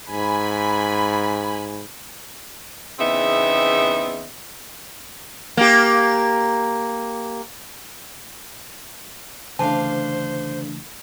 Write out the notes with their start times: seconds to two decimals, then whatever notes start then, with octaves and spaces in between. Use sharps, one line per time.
0.11 G#2 G#5 B5
2.99 E2 C#3 B3 C4 D#4 E5
5.57 A#3 G4
9.59 D2 C#3 E3 A3 D4 C5 F5 A5